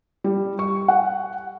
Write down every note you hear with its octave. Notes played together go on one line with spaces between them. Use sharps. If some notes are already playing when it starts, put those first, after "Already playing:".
G3
C#6
F#5